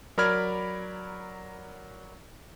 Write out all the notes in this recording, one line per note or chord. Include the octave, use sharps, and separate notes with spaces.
F#3 A#4 D5 B5 F6 G#6